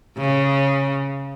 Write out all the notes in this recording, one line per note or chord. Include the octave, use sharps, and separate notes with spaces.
C#3